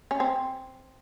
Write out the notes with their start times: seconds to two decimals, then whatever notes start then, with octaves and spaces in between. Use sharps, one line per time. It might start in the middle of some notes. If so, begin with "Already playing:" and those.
0.11 C#4
0.20 C4